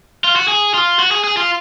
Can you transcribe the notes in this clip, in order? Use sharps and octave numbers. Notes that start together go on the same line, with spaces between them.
F4
F#4
G#4
F4
F#4
G#4
G#4
F4